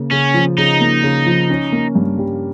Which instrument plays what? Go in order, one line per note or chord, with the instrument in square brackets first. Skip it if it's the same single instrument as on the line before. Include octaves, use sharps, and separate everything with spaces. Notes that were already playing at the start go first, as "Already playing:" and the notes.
Already playing: [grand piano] C#3 A#3
[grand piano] C#3 [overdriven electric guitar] C#4
[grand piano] F3
[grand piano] C#3 [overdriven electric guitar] D#4
[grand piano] A#3
C#3
F3
C#4
A#3
G2
G3